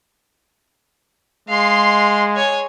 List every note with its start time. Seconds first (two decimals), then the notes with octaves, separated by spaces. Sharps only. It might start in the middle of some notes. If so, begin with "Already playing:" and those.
1.49 G#3 F5 C6
2.36 C#5 G#5